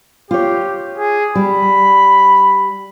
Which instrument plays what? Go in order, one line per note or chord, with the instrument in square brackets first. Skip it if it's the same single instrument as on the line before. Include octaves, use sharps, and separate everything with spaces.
[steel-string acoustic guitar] F4 C#5 [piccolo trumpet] G4
[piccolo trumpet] G#4
[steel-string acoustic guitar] G3 [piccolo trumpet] B5